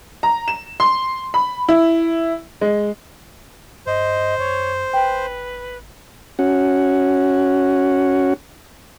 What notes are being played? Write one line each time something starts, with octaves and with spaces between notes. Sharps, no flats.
A#5
E7
C6
B5
E4
G#3
G2 C5 D#5
F#2 C#5
G#1 B4 G5
C#4 F#4